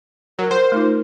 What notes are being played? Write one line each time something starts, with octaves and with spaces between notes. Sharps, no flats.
F#3 A#4
C5 F#5
A3 D#4 F4